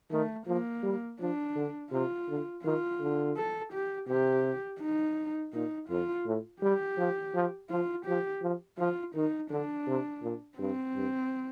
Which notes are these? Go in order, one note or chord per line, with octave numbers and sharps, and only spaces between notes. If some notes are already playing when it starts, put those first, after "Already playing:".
D#3 A3
F3 A#3
G3
F3 D4
D3
C3 F4
D3
D#3 F4
D3
A4
G4
C3 G4
D#4
A#2 D#4
F2 F4
A2
G3 G4
F3
F3
F3 F4
F3 G4
F3
F3 F4
D#3 D#4
D3 D4
C3
A#2
G2 C4
G2